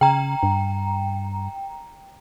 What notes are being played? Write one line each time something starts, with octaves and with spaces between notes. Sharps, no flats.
C#3 G5 A#5
G2